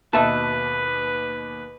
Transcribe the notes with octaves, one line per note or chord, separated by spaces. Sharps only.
D#2 B2 B4 E5 A5